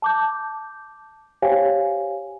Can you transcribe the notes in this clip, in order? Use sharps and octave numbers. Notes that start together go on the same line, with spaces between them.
A5 D6 G6
G4 C5 C#5 F5 G5 G#5